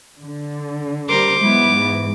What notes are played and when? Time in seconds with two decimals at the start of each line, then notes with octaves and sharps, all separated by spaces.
0.21 D3
1.09 G3 A#4 C5 D6
1.40 F#3 G#3 B3 E4
1.71 G#2 E3